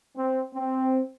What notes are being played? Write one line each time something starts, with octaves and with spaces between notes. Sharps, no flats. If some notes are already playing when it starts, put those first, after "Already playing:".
C4
C4